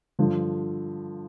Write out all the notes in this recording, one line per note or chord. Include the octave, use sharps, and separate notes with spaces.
G2 D3 F3